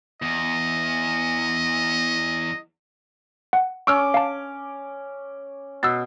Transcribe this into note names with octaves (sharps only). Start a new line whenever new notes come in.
E2 D#5
F#5
C#4 C#6 D6 E6 F6
F5 A5
B2 E6 A6